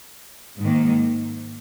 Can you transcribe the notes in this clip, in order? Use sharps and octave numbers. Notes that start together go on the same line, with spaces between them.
G#2 D#3 A#3